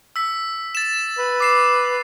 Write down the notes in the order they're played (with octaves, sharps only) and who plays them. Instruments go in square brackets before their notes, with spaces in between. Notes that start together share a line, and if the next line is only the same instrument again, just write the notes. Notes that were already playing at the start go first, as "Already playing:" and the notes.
[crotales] E6 B6
A6 E7
[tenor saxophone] B4
[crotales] D6 C7 E7